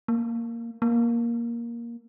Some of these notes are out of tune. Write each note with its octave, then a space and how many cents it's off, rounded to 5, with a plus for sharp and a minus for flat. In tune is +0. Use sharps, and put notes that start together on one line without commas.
A#3 -5
A#3 +10